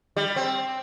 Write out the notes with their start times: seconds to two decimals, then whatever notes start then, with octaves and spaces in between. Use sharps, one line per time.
0.16 G3
0.36 C4